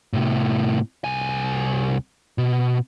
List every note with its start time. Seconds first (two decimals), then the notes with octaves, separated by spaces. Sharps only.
0.13 A2 C3
1.04 C2 G#5
2.38 B2